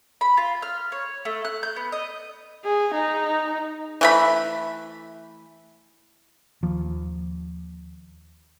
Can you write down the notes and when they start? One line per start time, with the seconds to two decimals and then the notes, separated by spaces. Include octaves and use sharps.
0.21 B5
0.37 F4
0.62 F6
0.92 C#5
1.25 A3
1.45 F#6
1.63 G6
1.76 B3
1.92 D#5
2.64 G#4
2.94 D#4
4.01 E3 A3 B5
6.63 D#2 F3